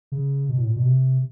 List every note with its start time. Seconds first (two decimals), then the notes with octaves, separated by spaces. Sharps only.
0.12 C#3
0.49 B2
0.58 A2
0.67 A#2
0.76 B2
0.85 C3